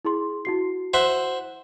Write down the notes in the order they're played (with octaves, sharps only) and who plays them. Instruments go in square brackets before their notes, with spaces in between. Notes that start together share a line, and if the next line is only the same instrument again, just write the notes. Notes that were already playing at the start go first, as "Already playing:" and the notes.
[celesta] E4 G#4 C6
E4 F#4 C7
[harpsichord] C5 E5 F#5